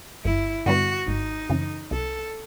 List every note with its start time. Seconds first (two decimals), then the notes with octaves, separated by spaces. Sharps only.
0.24 G1 E4
0.66 G2 D3 G3 B3 F#4
1.07 G#1 D#4
1.50 F#2 C#3 E3
1.91 C2 A4